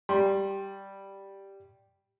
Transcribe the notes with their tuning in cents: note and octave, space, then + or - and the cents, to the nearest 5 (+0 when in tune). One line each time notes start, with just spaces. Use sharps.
G3 +0 C6 +25